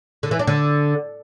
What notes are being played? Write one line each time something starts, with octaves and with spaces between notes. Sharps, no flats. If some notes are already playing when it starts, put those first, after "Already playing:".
D3
E3
D4
D3